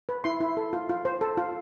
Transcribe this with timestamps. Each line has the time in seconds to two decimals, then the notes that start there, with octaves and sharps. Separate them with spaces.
0.09 B4
0.24 E4 C6
0.40 E4
0.57 A4
0.73 F4
0.89 F4
1.05 C5
1.21 A4
1.37 F4